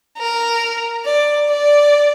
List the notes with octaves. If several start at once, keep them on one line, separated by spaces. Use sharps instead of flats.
A#4
D5
D5